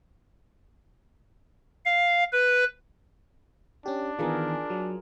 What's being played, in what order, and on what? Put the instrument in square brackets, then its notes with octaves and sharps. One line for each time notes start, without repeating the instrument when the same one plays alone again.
[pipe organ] F5
B4
[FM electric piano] C#4 G4 [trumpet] D4
[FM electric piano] D#3 E3 B3 [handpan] F4 G#4 A#4
[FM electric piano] F#3